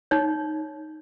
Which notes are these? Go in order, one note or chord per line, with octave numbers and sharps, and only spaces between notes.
D#4 C#5